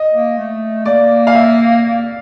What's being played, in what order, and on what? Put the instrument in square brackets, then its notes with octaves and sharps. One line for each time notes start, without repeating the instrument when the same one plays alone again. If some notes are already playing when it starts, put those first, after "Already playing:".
Already playing: [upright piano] D#5
[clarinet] A#3
A3
[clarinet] A#3 [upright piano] D5
[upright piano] F5
E5